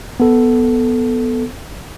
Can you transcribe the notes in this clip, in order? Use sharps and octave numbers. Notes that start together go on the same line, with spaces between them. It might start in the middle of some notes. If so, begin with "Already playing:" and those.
B3 A4